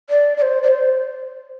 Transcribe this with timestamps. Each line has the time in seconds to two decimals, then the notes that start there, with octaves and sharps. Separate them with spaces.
0.09 D5
0.37 D5
0.42 C5
0.63 D5
0.68 C5